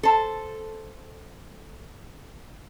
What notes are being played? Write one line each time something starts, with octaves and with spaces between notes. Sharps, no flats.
A4 C5